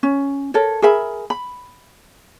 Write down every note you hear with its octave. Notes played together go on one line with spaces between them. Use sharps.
C#4
A4 A#4 C#5
G#4 A#4 E5 B5
B5